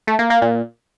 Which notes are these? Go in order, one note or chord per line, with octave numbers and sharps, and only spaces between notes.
A3
A#3
A#3
A#2